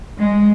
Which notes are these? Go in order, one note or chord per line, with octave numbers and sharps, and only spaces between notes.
G#3